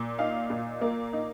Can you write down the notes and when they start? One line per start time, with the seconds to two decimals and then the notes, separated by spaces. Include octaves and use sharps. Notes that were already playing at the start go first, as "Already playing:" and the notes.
Already playing: A#2
0.19 D#4 F5
0.50 A#2
0.81 A#3
1.13 D#4